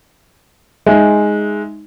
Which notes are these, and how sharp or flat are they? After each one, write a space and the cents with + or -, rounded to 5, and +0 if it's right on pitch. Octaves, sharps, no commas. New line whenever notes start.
G#3 +0 D#4 +0 E5 +0